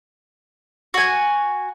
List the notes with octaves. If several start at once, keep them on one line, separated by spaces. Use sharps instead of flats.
F#4 G#5